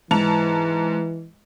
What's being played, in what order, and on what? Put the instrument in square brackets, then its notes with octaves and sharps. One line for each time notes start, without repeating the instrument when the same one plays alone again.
[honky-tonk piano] G#2 A5 F7 [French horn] E3